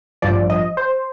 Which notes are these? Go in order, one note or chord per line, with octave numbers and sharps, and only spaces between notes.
A1 G2 F3 D5
D#5
C5